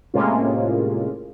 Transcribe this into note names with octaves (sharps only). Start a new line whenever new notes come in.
A2 C3 G#3 A#3 C#4 F4